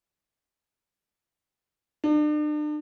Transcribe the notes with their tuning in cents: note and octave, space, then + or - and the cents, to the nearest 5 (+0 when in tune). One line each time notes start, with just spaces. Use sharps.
D4 +40